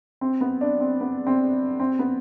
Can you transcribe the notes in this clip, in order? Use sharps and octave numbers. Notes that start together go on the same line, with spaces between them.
C4
B3
D4
C4
B3
C4
C4
B3